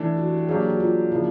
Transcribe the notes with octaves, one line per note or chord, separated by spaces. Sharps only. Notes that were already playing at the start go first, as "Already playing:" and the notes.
Already playing: E3 A3 D4
F#4
G4
G4
F#3 A#3 D4 G4 G#4
F#4
F4
C#3 F3 A#3 D4 E4